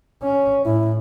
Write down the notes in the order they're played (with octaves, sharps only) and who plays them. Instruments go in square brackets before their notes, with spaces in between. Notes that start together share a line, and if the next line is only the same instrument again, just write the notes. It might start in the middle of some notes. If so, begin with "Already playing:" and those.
[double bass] C#4 [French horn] C#5
[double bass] A2 [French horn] E4